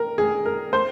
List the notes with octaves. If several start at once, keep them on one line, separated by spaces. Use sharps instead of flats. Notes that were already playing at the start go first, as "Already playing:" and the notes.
Already playing: A#4
G#4
A#4
C5